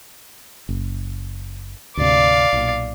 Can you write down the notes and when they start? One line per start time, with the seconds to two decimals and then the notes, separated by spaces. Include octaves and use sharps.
0.69 F#1
1.97 D2 G#2 C3 D5 F5
2.53 B1 A#2